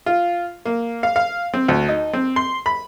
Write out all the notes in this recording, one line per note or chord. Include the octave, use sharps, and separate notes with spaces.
F4
A#3
F5
F5
C4
D2
D#4
C4
C6
B5